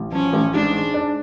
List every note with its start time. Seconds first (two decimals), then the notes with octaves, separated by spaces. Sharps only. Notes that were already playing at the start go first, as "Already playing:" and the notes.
Already playing: A1
0.12 F3 C#4
0.33 A1
0.54 G#2 D4
0.74 G#3
0.94 D4